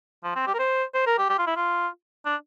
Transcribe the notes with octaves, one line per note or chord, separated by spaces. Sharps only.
F3
C4
G4
A#4
C5
C5
A#4
G4
G4
F4
E4
F4
D4